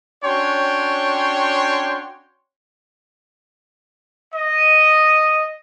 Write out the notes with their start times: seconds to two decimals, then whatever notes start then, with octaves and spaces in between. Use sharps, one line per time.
0.24 C#4 D4 F#4 C#5 G5 C6
4.34 D#5